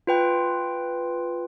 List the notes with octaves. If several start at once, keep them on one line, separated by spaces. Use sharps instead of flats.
F4 B4 G5